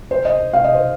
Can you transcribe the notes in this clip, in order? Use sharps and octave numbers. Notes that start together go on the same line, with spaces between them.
C5
D#5
F5
D#5
C5